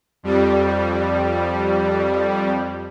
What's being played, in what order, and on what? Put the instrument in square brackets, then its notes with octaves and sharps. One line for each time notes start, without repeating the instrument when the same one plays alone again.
[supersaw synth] F2 G3